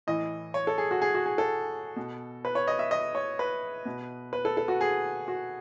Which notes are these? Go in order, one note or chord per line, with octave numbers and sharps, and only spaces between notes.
A2 E3 D#5
C#5
A4
G#4
F#4
G#4
F#4
G#4
A4
B2
B4
C#5
D#5
E5
D#5
C#5
B4
B2
B4
A4
A4
F#4
G#4
F#4